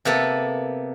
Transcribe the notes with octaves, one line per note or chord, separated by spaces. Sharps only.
C3 A#3 B3 A4